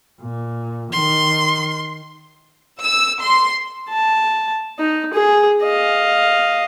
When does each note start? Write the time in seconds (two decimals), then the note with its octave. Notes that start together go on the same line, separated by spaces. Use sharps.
0.21 A#2
0.92 D#3 C6
2.81 E6
3.21 C6
3.90 A5
4.79 D#4
5.14 G#4
5.63 D#5 F5